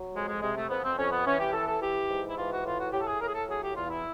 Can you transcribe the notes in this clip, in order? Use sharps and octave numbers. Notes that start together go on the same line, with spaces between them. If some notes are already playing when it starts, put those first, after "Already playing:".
Already playing: F#3
F2 G#3
G#3
C3 G#3
A3
F2 B3
C4
F2 C#4
B3
E3 C#4
G4
E3 A4
A4
E3 G4
G#2
E4
E3 F4
F#4
A2 F4
F#4
A2 G4
A4
G#4
A2 A#4
G#4
A4
F#3 G#4
G4
E2 F4
E4